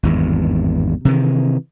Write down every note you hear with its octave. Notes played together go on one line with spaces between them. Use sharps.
G#1 E2 G2
C3 D#3 E3